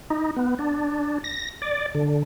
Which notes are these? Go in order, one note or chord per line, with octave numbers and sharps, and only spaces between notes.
D#4
B3
D4
A#6
D5
D3